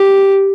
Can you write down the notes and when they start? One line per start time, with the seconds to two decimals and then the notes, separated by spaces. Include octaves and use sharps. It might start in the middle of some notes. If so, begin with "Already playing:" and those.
Already playing: G4